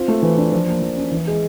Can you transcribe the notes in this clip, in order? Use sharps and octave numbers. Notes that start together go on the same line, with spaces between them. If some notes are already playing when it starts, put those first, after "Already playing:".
Already playing: C4 F4
A3
E3
D4
F3
A#3
F3
C#4
E3
G#3